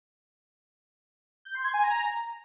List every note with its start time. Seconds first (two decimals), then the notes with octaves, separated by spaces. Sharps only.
1.45 G6
1.55 C6
1.64 G#6
1.74 G#5
1.83 A#5